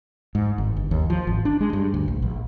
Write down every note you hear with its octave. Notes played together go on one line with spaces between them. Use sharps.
G#2
G#1
G1
D#2
F3
G#1
D4
G#3
G2
D2
A#1
A#1